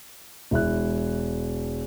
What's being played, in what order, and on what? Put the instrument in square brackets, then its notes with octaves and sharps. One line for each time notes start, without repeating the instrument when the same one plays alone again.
[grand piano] E1 E4 F#6